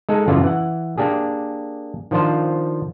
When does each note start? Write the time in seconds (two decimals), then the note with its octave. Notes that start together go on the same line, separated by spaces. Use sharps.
0.09 G#3 D#4 A4
0.28 F#2 C#3 E3 F4 D5
0.44 E3 F#5
0.98 A#3 D4 G4 G#4
2.11 D#3 F3 D4 F4 C5